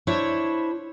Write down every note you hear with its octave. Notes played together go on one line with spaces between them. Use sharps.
D4 E4 C5 C#5